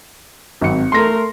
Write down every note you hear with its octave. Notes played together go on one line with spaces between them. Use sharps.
G#1 F#3 C4 C#7
A3 A#4 C6 A#6